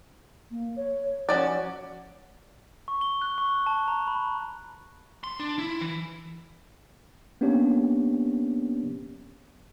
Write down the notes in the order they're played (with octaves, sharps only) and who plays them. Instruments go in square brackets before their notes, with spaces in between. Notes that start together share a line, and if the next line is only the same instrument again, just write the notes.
[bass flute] A#3
C#5
[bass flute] F3 [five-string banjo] C#4 F#4 D5
[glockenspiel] C#6
G7
F#6
C#6
A5
A#5
B5
[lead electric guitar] C6
D4
E4
E3
[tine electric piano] A#3 B3 C#4 D4 G4 C#5